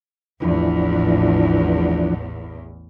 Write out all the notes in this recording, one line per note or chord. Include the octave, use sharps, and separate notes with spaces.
A1 E2 E3 F3 D4